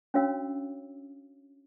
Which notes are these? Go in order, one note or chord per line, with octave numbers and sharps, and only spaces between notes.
C#4 D4 F#4 C#5 F5 E6